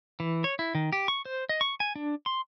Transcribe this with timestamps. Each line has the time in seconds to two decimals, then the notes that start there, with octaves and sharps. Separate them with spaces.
0.20 E3
0.44 C#5
0.59 E4
0.75 D#3
0.92 G4
1.08 C#6
1.25 C5
1.49 D#5
1.61 C#6
1.80 G#5
1.96 D4
2.26 C6